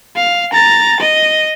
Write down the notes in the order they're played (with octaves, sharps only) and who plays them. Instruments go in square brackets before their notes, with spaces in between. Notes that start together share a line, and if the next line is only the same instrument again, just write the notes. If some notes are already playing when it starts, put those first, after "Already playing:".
[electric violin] F5
A#5 A6
D#5